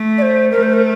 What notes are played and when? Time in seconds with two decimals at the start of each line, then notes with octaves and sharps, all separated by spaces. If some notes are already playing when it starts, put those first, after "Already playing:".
Already playing: A3
0.18 D5
0.22 C5
0.51 A3 A#4
0.63 C5
0.73 A#4